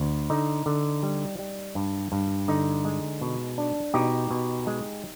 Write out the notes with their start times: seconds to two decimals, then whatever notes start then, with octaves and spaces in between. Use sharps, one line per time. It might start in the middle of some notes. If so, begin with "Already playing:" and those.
Already playing: D2
0.30 D3 D#4
0.66 D3
1.03 G3
1.39 G3
1.75 G2
2.12 G2
2.48 D3 D#4
2.85 G#3
3.21 B2
3.58 D4
3.94 B2 D#4 G4
4.31 B2
4.67 G#3